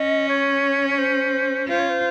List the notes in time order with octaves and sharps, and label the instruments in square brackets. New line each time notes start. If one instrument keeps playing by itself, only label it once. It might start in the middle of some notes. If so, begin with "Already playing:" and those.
Already playing: [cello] C#4 [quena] D#5
[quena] C#5
C#5
C5
[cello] F4 [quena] C5
[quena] C#5
C5